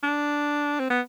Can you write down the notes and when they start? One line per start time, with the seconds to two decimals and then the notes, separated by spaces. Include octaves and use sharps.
0.03 D4
0.80 C4
0.90 B3